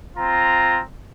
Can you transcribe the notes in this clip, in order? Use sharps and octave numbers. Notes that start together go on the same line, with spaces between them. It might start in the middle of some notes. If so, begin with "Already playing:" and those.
C4 F4 A#5